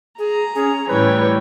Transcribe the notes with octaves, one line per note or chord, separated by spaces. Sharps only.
G#4 A#5
C#4 G#4
A2 E3 G3 B4 C#5 G5